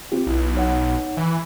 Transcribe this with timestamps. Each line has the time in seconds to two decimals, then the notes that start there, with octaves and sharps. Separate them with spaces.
0.12 C4 F4 G4
0.27 B1 E4
0.55 D#4 C#5 F#5
1.17 E3